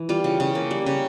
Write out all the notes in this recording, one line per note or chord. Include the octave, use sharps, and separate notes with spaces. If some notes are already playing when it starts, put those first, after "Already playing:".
Already playing: E3
G3 F4
C#3
C#3
A#3
G3
C#3